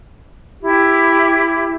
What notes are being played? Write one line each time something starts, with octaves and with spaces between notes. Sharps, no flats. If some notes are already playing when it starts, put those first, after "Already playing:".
E4 G4